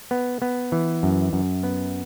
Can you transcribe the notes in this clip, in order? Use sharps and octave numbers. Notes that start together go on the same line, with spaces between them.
B3
B3
E3
F#2
F#2
B3